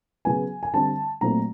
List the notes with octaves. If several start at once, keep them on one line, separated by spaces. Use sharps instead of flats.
C#3 F#3 B3 G#5
G#5
D3 G3 C4 A5
A#2 F#3 A3 C4 A#5